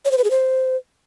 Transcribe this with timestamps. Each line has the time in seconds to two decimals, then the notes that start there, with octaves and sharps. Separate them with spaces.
0.05 C#5
0.11 C5
0.18 B4
0.24 G#4
0.31 C5